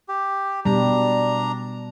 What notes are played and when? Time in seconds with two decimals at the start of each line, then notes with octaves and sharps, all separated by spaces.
0.09 G4
0.65 B2 G3 D4 A#5